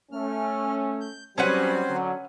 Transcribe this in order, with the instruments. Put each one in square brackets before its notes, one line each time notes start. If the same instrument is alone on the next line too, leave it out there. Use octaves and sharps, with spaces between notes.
[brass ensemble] A3 C#4 [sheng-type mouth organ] F6
[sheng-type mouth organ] G6
[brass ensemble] F#3 G3 [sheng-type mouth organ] C4 C5 [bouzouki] C#4 B4 F#5
[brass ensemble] D3 F#3